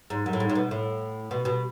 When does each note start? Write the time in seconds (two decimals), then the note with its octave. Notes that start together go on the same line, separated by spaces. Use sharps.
0.10 G#2
0.26 F#2
0.33 A2
0.40 G#2
0.49 A2
0.55 B2
0.71 A2
1.31 B2
1.45 B2